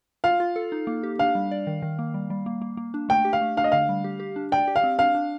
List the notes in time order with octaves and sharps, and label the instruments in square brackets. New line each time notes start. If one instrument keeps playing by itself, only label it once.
[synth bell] F4 [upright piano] F5
[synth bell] F4
A4
D#4
A#3
G4
[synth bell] D4 [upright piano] F5
[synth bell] G3
D5
D#3
D#3
A#3
G3
G3
A#3
A#3
A#3
D4
[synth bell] A3 [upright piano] G5
[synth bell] G4
[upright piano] F5
[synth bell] A3
[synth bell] D4 [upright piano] F5
[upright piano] D#5
[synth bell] D3 [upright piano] F5
[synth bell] G3
G4
G4
D4
[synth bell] D5 [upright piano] G5
[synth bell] G4
[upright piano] F5
[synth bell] C4
[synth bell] D4 [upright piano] F5
[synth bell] D4